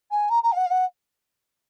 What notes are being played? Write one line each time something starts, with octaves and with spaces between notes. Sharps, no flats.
G#5
A#5
A#5
F5
F#5
F5
F#5